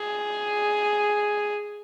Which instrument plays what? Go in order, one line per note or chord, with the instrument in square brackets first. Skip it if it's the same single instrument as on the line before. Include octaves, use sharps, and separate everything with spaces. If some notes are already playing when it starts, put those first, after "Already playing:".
Already playing: [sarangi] G#4